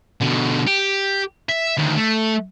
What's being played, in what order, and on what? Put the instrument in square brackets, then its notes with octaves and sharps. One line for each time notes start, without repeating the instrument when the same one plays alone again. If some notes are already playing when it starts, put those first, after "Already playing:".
[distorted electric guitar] B2 D3
G4
E5
D2 D#3
A3